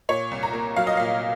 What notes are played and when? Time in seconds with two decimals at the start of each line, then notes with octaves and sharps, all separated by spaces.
0.09 A#2 C#5
0.31 C2
0.43 A#5
0.53 A#3
0.76 F#3 F5
0.87 D#5
0.97 A#2 F5